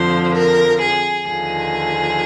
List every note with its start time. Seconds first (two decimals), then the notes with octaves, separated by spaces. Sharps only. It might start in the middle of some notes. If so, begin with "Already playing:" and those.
Already playing: F2 D3 F3 C5
0.34 A#4
0.81 G#4
1.28 D#2 D3 F3 G#4